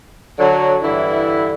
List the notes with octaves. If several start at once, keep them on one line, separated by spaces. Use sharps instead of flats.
D3 F#3
G2 D3 E3 E4